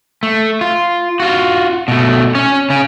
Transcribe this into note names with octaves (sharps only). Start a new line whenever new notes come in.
A3
F4
F4 F#4
B2 A3
C#4 C#5
C#3 C#4